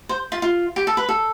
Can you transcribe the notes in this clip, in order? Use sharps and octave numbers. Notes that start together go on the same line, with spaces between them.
C5
F4
F4
G4
A4
B4
A4